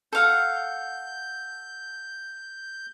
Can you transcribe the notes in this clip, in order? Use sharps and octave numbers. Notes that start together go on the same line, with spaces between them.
A4 F5 F#5 G6